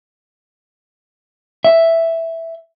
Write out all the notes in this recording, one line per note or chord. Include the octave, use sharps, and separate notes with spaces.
E5